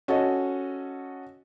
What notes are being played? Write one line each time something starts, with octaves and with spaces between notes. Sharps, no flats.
C#4 F#4 A4 D#5